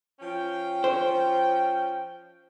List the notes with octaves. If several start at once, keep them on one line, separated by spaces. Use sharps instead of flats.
F3 C#4 G5
C5